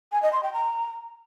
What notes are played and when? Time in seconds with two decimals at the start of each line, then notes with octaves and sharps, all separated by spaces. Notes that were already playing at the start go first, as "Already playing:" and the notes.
0.12 G#5
0.22 D#5
0.33 C6
0.43 G5
0.53 A#5